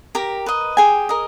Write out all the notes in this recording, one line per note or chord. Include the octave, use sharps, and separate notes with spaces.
G4 A#4 A#5
B4 D#5
G4 G#4 G#5
A#4 D#5